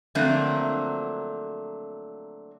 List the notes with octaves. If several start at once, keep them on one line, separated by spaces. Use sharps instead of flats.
D3 F3 F#3 A3 A#3 C4